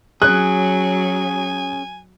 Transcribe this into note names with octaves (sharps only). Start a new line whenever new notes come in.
F#3 C#4 G#4 G#5 F#6